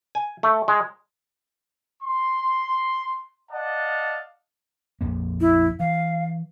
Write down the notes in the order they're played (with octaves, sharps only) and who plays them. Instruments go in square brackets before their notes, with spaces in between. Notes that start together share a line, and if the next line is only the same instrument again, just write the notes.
[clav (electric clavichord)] G#5
A3
G#3
[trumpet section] C6
D5 D#5 F5 F#5 A5
[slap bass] A#1 F2 A#3
[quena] E4
[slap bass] E3 [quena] F5